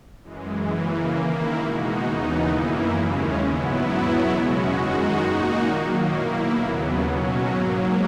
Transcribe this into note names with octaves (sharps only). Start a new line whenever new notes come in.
F#2 E3 G#3
C#3 E3 A#3
D#3 A#3 E4
B2 G#3 D#4 F#4
D#2 C#3 E3 B3 D#4
F#2 E3 A#3 E4
D#2 C#3 G#3 C#4
G#2 F#3 B3 E4
E2 B2 F#3 B3 E4
C#3 G#3 C#4 F#4
F#2 D#3 G#3 D#4 F#4
A#2 A#3 D#4 F#4
D#3 F#3 A#3
B2 A#3 E4
D#2 C#3 F#3 B3
B2 F#3 C#4 F#4
G#2 F#3 A#3